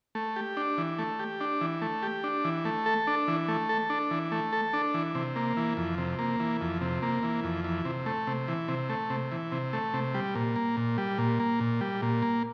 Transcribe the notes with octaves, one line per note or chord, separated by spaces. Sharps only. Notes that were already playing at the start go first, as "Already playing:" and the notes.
A3
G4
D4
E3
A3
G4
D4
E3
A3
G4
D4
E3
A3
A4
D4
E3
A3
A4
D4
E3
A3
A4
D4
E3
C3
A#3
E3
F2
C3
A#3
E3
F2
C3
A#3
E3
F2
E3
C3
A3
C3
E3
C3
A3
C3
E3
C3
A3
C3
G3
A#2
A#3
A#2
G3
A#2
A#3
A#2
G3
A#2
A#3